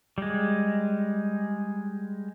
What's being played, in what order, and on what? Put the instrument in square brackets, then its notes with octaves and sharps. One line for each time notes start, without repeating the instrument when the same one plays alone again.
[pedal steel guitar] G3 G#3